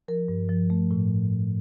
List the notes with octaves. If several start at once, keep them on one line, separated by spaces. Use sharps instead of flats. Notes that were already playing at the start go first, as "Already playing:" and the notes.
F3 A#4
G2
F3
A3
A2